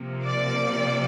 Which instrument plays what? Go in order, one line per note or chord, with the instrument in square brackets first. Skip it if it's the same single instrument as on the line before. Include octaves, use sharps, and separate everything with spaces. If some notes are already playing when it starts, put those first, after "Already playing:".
Already playing: [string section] C3 F3 A#3
D5